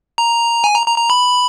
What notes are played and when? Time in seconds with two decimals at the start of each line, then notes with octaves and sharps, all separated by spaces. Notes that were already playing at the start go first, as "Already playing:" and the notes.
0.18 A#5
0.64 G#5
0.75 A#5
0.87 A#5
0.98 A#5
1.10 B5